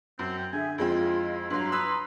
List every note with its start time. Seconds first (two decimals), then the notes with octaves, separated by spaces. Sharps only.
0.19 F#2 C4
0.38 G5
0.53 D3 G#4 E5 G#5
0.78 F2 G#3 C4 E4 F4 D#5
1.50 G2 F#3 A#5 C6
1.72 B4 B5 D#6 E6